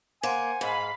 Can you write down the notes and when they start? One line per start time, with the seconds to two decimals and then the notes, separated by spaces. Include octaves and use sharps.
0.23 A#3 C5 F#5 G#5
0.61 G#2 F5 B5